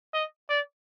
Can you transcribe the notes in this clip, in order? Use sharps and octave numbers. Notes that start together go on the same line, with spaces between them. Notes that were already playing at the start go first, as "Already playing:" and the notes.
D#5
D5